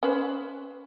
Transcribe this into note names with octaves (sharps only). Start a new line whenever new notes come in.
C#4 B4 C5